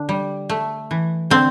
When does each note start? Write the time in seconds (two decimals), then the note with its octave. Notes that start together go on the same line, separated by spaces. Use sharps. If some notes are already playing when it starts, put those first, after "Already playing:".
Already playing: D3 D4
0.09 G3
0.50 A3
0.91 E3
1.30 D3 C4